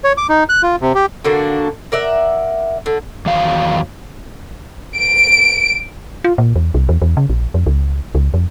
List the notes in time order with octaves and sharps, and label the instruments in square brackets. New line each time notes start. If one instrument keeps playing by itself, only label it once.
[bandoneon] C#5
D6
D#4
F#6
F4
C3
G4
[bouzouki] D3 A#3 D4 F#4
A#4 D5 E5 F#5
D3
[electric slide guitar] E2 D#3 F#3 F5
[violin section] D7
[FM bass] F4
A#2
E2
C2
E2
E2
C#3
A#1
F2
C#2
C#2
F2